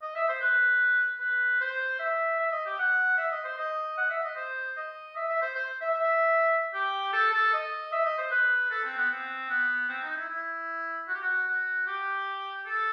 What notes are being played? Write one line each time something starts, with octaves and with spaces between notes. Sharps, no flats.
D#5
E5
C5
B4
B4
C5
E5
E5
D#5
G4
F#5
E5
D#5
C5
D#5
F#5
E5
D#5
C5
D#5
E5
E5
C5
C5
E5
E5
G4
A4
A4
D#5
E5
D#5
C5
B4
A4
C4
B3
C4
B3
C4
D#4
E4
E4
F#4
G4
F#4
F#4
G4
A4